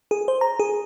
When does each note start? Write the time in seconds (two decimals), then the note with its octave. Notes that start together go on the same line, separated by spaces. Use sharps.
0.11 G#4
0.28 C5
0.41 A#5
0.59 G#4